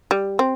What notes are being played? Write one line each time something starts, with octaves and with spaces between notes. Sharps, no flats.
G3
C4